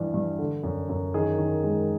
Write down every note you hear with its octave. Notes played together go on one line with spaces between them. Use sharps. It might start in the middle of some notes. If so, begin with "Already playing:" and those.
Already playing: G2 E3 G3
G2
D3
F#2
F#2
D#3 G#4
D#3
G#3